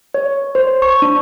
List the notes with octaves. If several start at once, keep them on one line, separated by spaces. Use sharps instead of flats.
C#5
C5
C#6
D4